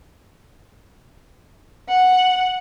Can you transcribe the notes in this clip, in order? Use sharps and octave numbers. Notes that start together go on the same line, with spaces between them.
F#5